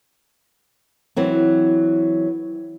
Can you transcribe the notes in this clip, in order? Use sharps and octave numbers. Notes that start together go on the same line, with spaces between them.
E3 F#3 C4